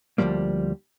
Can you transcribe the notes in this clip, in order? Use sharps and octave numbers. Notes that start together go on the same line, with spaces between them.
D2 B2 F3 G3 A#3